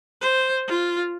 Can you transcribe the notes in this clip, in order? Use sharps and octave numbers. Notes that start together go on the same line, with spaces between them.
C5
F4